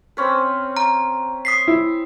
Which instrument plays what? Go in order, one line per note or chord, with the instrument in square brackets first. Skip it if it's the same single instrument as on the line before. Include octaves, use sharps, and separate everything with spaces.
[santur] C4 C#4 B4
[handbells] A#5
D#6 B6 C7
[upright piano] E4